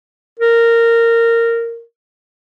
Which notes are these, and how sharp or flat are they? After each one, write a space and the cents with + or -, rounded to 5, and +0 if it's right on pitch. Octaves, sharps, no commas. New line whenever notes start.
A#4 -15